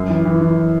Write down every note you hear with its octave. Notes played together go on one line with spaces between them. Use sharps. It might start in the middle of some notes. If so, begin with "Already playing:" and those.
Already playing: F#2
E3
E3
E3